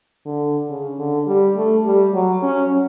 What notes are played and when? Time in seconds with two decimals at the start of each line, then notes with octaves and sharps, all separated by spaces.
0.26 D3
0.70 C#3
0.99 D3
1.27 G3
1.56 A3
1.86 G3
2.14 F#3
2.43 C#4